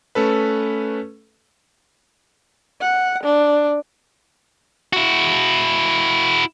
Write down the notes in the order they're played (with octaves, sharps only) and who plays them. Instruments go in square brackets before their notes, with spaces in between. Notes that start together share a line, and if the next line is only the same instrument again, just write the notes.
[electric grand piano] A3 C#4 A4 B4
[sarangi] F#5
D4
[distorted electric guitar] E4 F#4